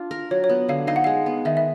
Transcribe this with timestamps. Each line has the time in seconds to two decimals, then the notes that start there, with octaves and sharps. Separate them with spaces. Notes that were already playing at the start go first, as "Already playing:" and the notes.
Already playing: D4 F4
0.11 A#4
0.31 F#3 C#5
0.44 C#5
0.49 B3
0.69 D3 F5
0.87 D#4 F5
0.96 F#5
1.04 G#3 F5
1.26 B3
1.45 D#3 E5
1.57 E5